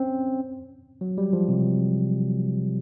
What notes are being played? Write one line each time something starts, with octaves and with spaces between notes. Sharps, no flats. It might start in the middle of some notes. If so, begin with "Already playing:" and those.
Already playing: C4 C#4
F#3
G3
F3
C3